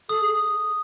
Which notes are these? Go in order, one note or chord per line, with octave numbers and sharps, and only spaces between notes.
A4 D#6
G#4